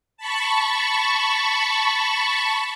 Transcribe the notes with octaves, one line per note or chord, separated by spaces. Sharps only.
A5 B5 C#6